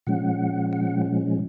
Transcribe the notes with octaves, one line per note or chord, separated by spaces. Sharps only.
A#2 F3 G#3 C#4 F#5
F#5